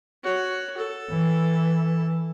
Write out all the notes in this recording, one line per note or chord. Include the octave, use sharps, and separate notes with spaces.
F#4 C#5
A4
E3